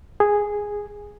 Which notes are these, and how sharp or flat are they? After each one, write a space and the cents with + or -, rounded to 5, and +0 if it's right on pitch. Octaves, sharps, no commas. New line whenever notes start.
G#4 -5